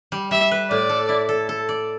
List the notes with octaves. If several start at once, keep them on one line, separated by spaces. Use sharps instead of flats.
G3
G3 E5
B4
A2 D5
A4
E4
A4
A4
D5